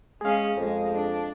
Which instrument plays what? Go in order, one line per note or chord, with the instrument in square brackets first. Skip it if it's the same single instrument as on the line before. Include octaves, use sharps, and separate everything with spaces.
[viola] G#3 C#4 [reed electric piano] G#4 F5
[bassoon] F2 [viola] G#3
[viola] D4